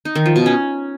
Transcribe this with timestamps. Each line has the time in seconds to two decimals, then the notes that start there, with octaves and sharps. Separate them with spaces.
0.05 D#4
0.15 D#3
0.26 F3
0.36 B2
0.46 C#4